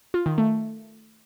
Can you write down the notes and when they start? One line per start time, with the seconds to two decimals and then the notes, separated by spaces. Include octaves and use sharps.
0.14 F4
0.26 D#3
0.38 A3